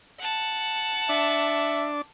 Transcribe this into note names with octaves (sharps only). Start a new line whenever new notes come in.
F#5 A5
D4 E5